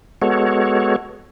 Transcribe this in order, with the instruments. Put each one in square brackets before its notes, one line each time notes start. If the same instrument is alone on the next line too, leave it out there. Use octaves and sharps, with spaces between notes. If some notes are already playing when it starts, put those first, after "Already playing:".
[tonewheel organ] G#3 B3 F#4 A4 C#5